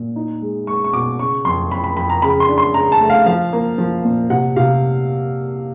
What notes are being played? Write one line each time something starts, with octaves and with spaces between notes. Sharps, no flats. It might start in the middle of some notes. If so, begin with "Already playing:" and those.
Already playing: A#2
D#4
G#3
G#3 C#6
C#6
B2 D6
C#3 C#6
F2 C6
F2 B5
B5
F2 B5
A#5
C#3 B5
C6
D4
C6
C#3 A#5
A5
A3
F5
F3 F5
A#3
F3
A#2
C3 F#5
C3 F5